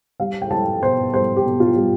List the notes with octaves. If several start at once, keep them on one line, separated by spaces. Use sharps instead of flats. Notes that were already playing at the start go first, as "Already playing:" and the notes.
G3 F5
G5
G3 A5
B2 C5
G3 C5
G4
B2
F4
G3